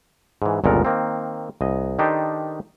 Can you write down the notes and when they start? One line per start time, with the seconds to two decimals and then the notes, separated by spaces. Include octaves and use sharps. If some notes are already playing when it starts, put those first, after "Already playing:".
0.42 G#2 E3
0.64 G1 C#2 A#2 B3 A4 A#4
0.85 D#3 A#3 C4
1.61 C2 D#5
1.99 D#3 D4 D#4 G4 A4 C5